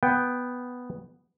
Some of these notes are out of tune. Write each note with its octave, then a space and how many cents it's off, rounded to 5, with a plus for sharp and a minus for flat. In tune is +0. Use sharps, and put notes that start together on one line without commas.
B3 +0 G5 +0